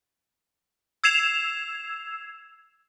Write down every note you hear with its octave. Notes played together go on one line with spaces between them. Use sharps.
E6 G#6 C7 E7 F7